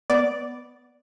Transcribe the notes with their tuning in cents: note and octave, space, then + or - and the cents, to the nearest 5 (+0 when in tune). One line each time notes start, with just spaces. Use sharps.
B3 +0 D5 -5